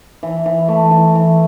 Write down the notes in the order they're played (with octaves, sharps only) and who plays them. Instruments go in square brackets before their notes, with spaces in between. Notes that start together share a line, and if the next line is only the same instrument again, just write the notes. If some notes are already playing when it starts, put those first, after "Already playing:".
[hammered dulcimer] E3
E3
A3
E3
E3